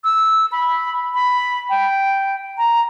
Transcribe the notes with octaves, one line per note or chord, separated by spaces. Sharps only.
E6
B5
B5
G5
A#5